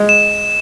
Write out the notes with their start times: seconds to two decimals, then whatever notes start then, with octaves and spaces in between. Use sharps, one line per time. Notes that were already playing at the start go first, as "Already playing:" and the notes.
Already playing: G#3
0.09 E7